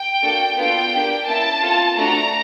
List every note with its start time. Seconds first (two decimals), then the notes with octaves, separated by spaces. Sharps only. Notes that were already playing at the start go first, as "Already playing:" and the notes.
Already playing: G5
0.22 A#3 D4 F#4 A4
0.57 B3 D4 F4 A4 G5
0.92 A#3 D4 G4
1.27 A#3 C#4 E4 A5
1.62 C4 F4 A4
1.97 A3 D4 F#4 A4 A#5